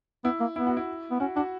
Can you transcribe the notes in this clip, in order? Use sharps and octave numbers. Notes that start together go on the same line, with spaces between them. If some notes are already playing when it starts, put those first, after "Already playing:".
B3 E4
A#3
B3 E4
F#4
E4
B3
C#4 F#4
D4 F#4